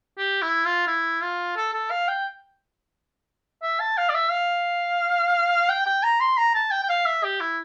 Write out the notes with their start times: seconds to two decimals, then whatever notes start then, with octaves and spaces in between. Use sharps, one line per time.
0.18 G4
0.42 E4
0.65 F4
0.87 E4
1.22 F4
1.56 A4
1.73 A4
1.90 F5
2.08 G5
3.62 E5
3.80 A5
3.97 F5
4.09 D5
4.14 E5
4.31 F5
5.69 G5
5.86 G5
6.03 A#5
6.20 C6
6.37 A#5
6.54 A5
6.71 G5
6.83 G5
6.89 F5
7.06 E5
7.24 G4
7.40 E4